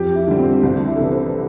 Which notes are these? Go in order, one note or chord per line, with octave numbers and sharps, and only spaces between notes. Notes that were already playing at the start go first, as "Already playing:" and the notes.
Already playing: F2 G4
E4
D3 G3
C4
C2 D4
E4
A4
C3 E3 B4
C5